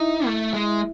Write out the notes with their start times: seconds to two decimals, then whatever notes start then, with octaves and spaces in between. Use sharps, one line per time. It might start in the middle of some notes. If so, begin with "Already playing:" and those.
Already playing: D#4 E4 E5
0.26 A3
0.53 G#3